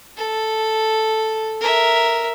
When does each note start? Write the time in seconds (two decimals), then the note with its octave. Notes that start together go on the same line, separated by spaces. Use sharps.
0.17 A4
1.61 A#4 E5